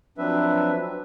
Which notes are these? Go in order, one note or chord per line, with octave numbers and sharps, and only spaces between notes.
F3 F#3 C4 D4 B4 E5